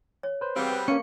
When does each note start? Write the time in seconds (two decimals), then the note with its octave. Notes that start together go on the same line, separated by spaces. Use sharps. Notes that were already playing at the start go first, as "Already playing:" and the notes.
0.23 C#5
0.41 B4 C5
0.56 G3 B3 C4 F#4 G#4 F5
0.72 B4
0.88 A#3 C#4 F5 A5 C#6 C#7